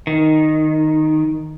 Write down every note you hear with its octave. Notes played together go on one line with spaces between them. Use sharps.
D#3